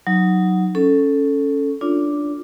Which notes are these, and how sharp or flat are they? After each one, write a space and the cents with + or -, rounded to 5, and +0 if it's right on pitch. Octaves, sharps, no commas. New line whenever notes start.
F#3 +0 D#4 +5
C#4 +0 A4 +0
D4 +0 F4 +0 D5 -40